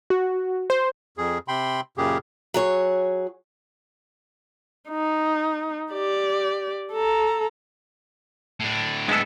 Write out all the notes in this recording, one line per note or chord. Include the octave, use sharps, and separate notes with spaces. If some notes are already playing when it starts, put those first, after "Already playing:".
F#4
C5
F2 G#4
C3 G5 B5 C6
F#2 A#2 C#3 G4 G#4
F#3 G#4 C#5
D#4
G4 D5
A4 A#5
A2 D4
G#3 B3 A4